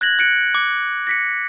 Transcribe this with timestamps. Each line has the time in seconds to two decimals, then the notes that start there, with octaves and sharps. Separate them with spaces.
0.01 F#6 G#6 A#6 F#7
0.19 F#6 C#7 D7
0.55 D6 C#7
1.07 A#6 B6 C#7